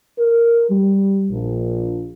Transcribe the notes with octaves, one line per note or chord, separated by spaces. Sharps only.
A#4
G3
A#1